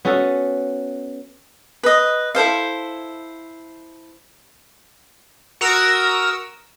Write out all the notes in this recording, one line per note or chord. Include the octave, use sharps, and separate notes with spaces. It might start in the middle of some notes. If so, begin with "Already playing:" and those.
B3 C#4 F#4 A4
B4 D#5
E4 A4 C5 F5
F#4 A#4 D#6 E6